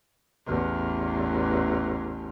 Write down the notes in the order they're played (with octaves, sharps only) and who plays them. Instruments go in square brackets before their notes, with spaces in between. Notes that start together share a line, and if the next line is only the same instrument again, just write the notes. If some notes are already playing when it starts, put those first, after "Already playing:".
[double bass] A1 E2